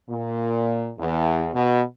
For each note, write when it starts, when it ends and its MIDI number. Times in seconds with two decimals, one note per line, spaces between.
0.10 0.90 46
0.99 1.48 40
1.54 1.82 47